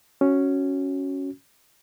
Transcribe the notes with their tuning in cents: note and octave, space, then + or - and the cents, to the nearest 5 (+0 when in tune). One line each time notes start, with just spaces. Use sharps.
C#4 +0 F#4 +0